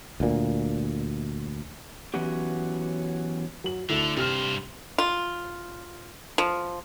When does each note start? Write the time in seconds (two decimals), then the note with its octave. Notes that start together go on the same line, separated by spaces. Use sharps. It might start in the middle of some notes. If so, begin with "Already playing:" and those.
0.20 D2 A#2
2.14 E3 F#3 B3 C#4 F#4 G4
3.64 F#3 F#7
3.89 D2 D3 E4 A4
4.17 G2 C3 C5 F6
4.98 F4
6.38 F3